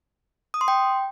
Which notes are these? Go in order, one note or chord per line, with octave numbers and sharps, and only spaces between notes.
D#6
C6
G5